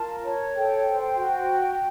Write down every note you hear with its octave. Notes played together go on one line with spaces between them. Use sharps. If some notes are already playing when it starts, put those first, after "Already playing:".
Already playing: F4 A#4 A5
C#5
A4 G5
C5
F#4